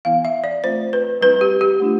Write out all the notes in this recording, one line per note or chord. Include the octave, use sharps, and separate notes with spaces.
E3 B3 E4 F5
E5
D5
A3 C4 F4 C5
B4
G3 C4 E4 B4
G4
G4
A3 D4 F4